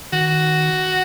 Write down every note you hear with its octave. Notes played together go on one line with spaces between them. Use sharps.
D#3 F#4